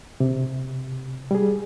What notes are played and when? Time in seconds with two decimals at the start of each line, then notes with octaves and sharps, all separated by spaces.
0.20 C3
1.31 G3 G#4